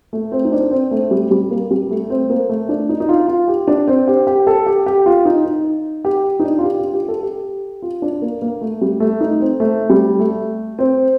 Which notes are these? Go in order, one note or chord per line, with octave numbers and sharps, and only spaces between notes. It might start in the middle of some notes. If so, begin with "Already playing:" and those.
A3
C4
D#4
D4
C4
A3
G3
G3
A#3
G3
A3
C4
A#3
A3
D4
D#4
D#4
F4
F4
G4
D4
C4
G4
G4
A4
G4
G4
F4
D#4
D#4
G4
D#4
D4
F4
G4
F4
G4
A4
G4
F4
D4
A#3
A#3
A3
G3
A3
D#4
C4
A3
G3
A3
C4